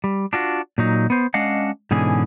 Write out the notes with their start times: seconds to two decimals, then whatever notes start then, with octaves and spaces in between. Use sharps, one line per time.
0.04 G3
0.33 D4 F4 F#4
0.78 A#2 F#3 D#4
1.10 B3 C5
1.34 G#3 C#4 D4 D#5 F5 F#5
1.91 G#2 B2 D3 E3 C#4 G#4